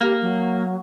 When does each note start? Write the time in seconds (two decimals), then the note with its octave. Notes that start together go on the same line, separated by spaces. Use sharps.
0.01 A#3 G4
0.22 F#3